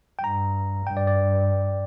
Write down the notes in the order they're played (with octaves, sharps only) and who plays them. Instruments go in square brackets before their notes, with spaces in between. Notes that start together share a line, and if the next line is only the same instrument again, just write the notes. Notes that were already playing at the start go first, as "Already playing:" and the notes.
[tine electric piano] G5
[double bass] G2 [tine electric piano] A#5
[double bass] G2 [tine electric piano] G5
[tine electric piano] D5
D5